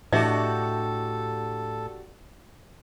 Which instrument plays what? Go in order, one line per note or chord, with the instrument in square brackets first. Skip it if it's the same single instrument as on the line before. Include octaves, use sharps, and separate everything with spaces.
[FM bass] A2 [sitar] D4 F#4 G4 [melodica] A4 [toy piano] D#5 E5